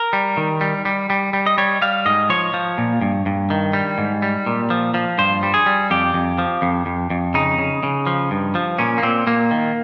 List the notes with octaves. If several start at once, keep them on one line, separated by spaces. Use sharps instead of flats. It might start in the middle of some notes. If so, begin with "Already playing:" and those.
Already playing: A#4
G3
D#3
G3
G3
G3
G3
D#5
G3 C#5
G3 F5
G#2 D#5
F3 C#5
F3
A#2
G2
G2
D#3
G3
G#2
G3
A#2
F3
F3
G2 C5
G3
G#4
G3
F2 G4
F2
F3
F2
F2
F2
C#3 D#4
C#3
C#3
F3
G2
F3
A#2 C#4
A#3
A#2 C4
A#2 A#3
D#3